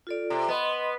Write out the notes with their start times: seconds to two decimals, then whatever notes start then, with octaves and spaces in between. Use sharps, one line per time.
0.07 F4 A4 D5
0.30 C3
0.48 B3 D#5 B5 C6